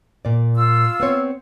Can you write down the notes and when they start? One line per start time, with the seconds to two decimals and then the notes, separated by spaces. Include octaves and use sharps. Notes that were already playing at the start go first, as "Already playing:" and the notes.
0.25 A#2 D5
0.54 F4 E6
1.00 B3 C4 C#5